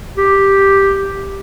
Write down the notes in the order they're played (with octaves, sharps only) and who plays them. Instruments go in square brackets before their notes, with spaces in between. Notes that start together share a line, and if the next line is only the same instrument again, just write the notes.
[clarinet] G4